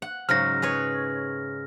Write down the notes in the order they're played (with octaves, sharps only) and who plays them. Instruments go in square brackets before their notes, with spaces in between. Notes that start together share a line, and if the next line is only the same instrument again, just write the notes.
[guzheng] F#5
[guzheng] G#2 C#3 F#3 [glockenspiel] F6 A#6
[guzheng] G#4 B4 C#5